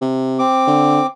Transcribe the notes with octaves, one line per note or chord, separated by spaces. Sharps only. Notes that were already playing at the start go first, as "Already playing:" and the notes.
C3
C4 D6
D3